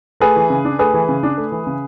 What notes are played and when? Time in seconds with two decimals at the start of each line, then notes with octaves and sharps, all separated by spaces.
0.20 A3 G#4 B4
0.36 E3
0.50 C#3
0.65 D4
0.79 A3 G#4 B4
0.94 E3
1.09 C#3
1.23 D4
1.37 A3
1.52 E3
1.67 C#3